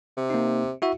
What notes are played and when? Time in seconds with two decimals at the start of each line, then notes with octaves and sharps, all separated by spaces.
0.17 C3
0.30 A#3 D#4
0.82 E4 F#4 E5